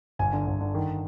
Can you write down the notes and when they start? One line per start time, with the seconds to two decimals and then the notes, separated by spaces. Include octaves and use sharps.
0.19 G1 G#5
0.33 D3
0.47 G1
0.61 D3
0.75 D#3